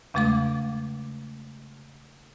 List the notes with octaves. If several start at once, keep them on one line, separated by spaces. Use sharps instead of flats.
E2 C#3 G#3 A3 F5 D6